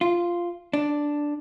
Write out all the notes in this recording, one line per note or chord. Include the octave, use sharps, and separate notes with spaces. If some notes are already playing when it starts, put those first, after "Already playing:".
F4
D4